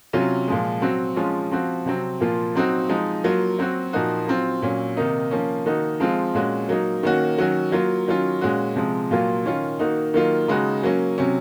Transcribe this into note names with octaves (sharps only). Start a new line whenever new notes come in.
C3 F#3 C#4 F4
A#2 F3 G#3
F#3 C4 F#4
F3 G#3 C#4 F4
F3 C4 F#4
C3 F#3 C4
A#2 F3 A#3 F4
F#3 C4 D#4 F#4
F3 G#3 D#4
F#3 A#3 F4
F#3 C4 F#4
A#2 F3 A#3 D#4 F#4
F#3 C4 F4
A#2 F#3 C#4
C3 D#3 A#3 D#4
F3 A#3 C#4
D#3 A#3 D#4 F#4
F3 G#3 C4 F4
A#2 G#3 C#4 F#4
F#3 A#3 D#4
D#3 A#3 C#4 F#4
D#3 F#3 C#4 F#4
F#3 A#3 F4
D#3 F#3 C#4 F4
A#2 G#3 C#4 F#4
C3 F3 G#3
A#2 F#3 A#3 F4
D#3 A#3 C#4 F4
D#3 A#3 D#4 F#4
D#3 F#3 A#3 F4
C#3 G#3 D#4 F#4
F#3 A#3 C#4
C3 F#3 C#4